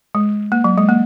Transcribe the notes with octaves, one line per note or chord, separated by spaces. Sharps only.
G#3
A#3
F#3
G#3
A#3